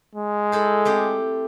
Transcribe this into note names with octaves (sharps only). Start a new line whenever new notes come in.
G#3
E4 A4 C5
A3 C4 G4